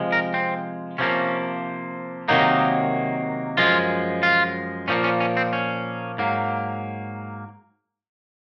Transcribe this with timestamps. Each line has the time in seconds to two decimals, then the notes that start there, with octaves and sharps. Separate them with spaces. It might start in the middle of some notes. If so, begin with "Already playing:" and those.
Already playing: C3 F3 G#3
0.12 A#4
0.34 C4
0.98 C3 F3 A#3 C#4
2.28 C3 D#3 F#3 A#3 D#4
3.57 F#2 F3 G#3 F4
4.23 F4
4.88 A#2 F3 A#3 C#4
5.04 C#4
5.20 C#4
5.37 C4
5.53 C#4
6.18 G#2 F#3 A#3